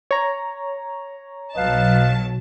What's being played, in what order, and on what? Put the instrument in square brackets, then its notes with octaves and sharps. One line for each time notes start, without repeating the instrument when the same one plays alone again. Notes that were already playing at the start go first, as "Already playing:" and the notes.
[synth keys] C#5 A#5
[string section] B1 F#3 A5 [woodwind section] B4 D#5 F5